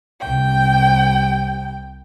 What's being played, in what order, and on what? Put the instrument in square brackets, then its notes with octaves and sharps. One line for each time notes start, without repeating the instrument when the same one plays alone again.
[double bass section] C2 [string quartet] G5